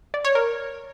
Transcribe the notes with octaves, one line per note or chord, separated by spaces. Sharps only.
D5
C#5
A#4